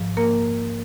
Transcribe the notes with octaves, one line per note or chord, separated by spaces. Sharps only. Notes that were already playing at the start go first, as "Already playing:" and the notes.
Already playing: G#2 F3
A#3 A#4